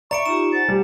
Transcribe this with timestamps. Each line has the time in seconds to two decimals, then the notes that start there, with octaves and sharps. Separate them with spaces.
0.11 D5 E5 A#5 B5 C#6 C#7 D7
0.26 D#4 F4 G4 E7
0.53 C5 F#5 G#5 A6
0.69 G3